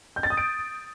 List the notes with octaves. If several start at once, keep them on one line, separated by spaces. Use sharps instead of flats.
G6
A6
D#6
D7